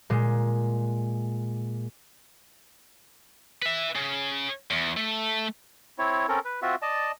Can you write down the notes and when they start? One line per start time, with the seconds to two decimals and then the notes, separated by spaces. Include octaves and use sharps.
0.10 A#2 G#3
3.62 B4 E5
3.96 C#3
4.71 E2
4.97 A3
5.99 C4 E4 C#5
6.28 C4 C#4 A4 A#4
6.45 B4
6.62 C4 F4 F#4 E5
6.82 D5 D#5 A5